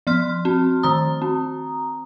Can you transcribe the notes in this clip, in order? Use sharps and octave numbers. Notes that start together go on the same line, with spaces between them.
F3 C6 F6
C4
D#3 A#5 D#6
C4